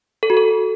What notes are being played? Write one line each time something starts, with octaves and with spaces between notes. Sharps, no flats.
A4
F#4
A4